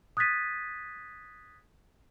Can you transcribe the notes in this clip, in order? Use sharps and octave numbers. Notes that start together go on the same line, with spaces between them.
D#6 F#6 G#6 A6 B6 D#7